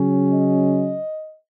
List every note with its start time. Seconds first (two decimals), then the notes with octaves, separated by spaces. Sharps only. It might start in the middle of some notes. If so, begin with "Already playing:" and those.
Already playing: C#3 F#3 C#4
0.30 D#5